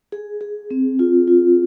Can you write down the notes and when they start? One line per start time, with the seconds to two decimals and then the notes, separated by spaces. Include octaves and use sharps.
0.12 G#4
0.41 G#4
0.71 C4
0.99 F4
1.27 F4